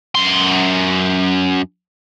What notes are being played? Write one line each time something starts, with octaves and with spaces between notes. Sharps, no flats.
F#2 C6